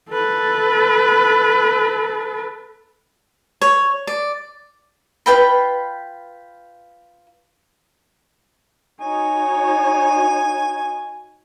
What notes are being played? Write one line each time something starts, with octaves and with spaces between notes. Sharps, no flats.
A4 B4
C#5
D5
F4 B4 G5 B5
D#4 F#4 C#5 G#5